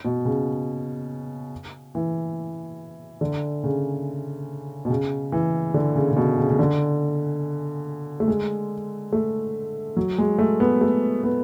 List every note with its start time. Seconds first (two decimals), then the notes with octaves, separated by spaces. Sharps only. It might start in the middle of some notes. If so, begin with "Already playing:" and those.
0.05 B2
0.25 C#3
1.95 E3
3.21 D3
3.63 C#3
4.85 B2
4.90 C#3
5.32 E3
5.74 D3
5.95 C#3
6.11 C#3
6.17 B2
6.38 C#3
6.49 C#3
6.59 D3
8.20 A3
8.28 G#3
9.13 A3
9.97 F#3
10.18 G#3
10.39 A3
10.60 B3
10.81 A3
11.23 B3